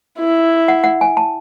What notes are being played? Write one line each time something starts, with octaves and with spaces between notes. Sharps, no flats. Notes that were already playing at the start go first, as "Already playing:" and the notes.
E4
F#5
F#5
G#5
A5